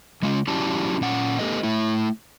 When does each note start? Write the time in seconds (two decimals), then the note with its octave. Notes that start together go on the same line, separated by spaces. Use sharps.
0.22 C#3 G#3 C#4 F4
0.48 F#3 C#4 E4 G4 D5 A5
1.01 A#2 C#4 F#5
1.39 A#3 C4 G4 A4 B4 D#5
1.63 A3 E4